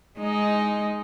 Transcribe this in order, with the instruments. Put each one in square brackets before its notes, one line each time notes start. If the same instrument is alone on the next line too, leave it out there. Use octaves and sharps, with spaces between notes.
[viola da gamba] G#3 D#4